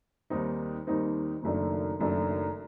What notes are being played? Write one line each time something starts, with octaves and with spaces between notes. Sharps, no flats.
D#2 D#3 G3 C4 D#4
D#2 D#3 G3 C4 D#4
F#1 F#2 D#3 A3 D4
F#1 F#2 D#3 A3 D4